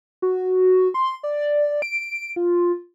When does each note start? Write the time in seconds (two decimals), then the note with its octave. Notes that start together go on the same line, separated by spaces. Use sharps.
0.22 F#4
0.94 C6
1.23 D5
1.82 D7
2.36 F4